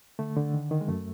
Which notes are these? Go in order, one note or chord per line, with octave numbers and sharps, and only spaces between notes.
D3 A3
D3
D#3
D#3
G#3
F#2 A3